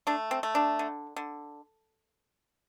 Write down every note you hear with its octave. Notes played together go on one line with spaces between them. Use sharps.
A3 D4
C4
A3
D4
D3
D3